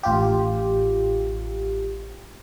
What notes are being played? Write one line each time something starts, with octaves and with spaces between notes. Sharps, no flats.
A1 F4 G4